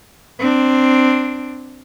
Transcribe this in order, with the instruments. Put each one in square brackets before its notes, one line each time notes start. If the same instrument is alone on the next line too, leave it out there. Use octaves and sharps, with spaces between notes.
[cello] C4 D4